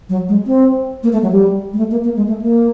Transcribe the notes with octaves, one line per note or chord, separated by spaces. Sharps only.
F#3
G#3
C4
A#3
A3
F#3
G3
G#3
A3
A#3
A#3
G#3
A3
A#3